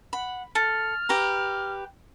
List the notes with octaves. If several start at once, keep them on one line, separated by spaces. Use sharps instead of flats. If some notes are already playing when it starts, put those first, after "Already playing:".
F#5 B5
A4 F6
G4 B4 A#5